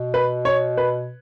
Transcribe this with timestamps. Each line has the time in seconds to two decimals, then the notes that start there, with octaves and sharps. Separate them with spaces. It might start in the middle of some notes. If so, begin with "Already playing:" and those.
Already playing: B2
0.14 B4
0.45 C#5
0.77 B4